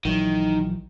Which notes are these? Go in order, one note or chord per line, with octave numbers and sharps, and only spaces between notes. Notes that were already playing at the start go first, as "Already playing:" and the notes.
A#1 D#3 E3 F#3